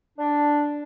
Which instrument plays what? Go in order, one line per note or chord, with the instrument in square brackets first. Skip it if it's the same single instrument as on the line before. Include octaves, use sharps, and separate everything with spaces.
[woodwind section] D4